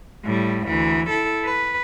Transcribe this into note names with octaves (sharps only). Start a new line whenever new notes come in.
A2 G3
D2 E3
E4 A4
B4